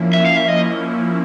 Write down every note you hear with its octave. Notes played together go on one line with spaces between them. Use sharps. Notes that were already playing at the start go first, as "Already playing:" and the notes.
Already playing: F3 A#3 C#4 E4
E5
F5
E5
D#5